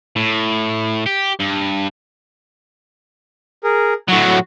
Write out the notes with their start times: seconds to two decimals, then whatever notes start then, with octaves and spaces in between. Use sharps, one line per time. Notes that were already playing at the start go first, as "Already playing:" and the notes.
0.16 A2
1.06 G4
1.40 G2
3.64 G#4 A#4
4.09 A2 F#3 F#4